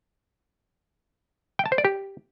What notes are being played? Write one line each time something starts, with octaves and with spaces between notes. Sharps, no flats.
G5
A5
C5
D5
G4